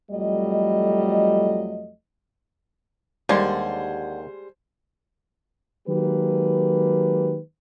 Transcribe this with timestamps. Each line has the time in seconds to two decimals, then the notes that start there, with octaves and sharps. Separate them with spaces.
0.11 F2 F#3 G3 A3 D#5
3.29 D#2 D3 G3 G#3 C5 C6 G#6
5.86 D#3 F#3 G#3 A#3 G4 B4